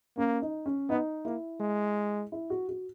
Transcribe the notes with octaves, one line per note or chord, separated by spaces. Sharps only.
A#3 C#4
D#4
C#4
B3 D#4
A#3 E4
G#3
E4
F#4
F#4